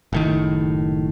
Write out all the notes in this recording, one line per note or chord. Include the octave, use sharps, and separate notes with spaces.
F#1 A2 D#3